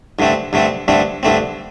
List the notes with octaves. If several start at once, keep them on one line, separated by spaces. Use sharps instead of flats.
G2 D3 A3 C4
G2 D3 A3 C4
G2 D3 A3 C4
G2 D3 A3 C4